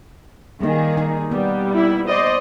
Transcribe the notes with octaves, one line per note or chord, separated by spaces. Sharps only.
D#3 G3 A#3 G#4
D#4
G3 B3
E4
C5 D5 D#5